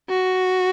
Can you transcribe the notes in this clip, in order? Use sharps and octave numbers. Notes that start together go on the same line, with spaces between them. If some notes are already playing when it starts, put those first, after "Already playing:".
F#4